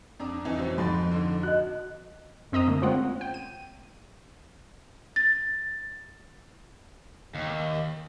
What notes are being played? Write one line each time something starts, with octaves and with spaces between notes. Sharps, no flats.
F2 D4 A#5 D#6
F2 E3 D#4
B2 F#3 C4
F2 G#2 B5 C6 A6
D3
F#4 D#5 F#6
F#2 C4 D#5 A#5 D#6
D3 A3 A#3
G#3 C4 C#4 F4 F#5
G5
D#7
A6
D#2